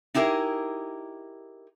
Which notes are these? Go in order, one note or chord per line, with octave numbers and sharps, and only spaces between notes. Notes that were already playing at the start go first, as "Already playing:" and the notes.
D#4 E4 G4 G#4 A#4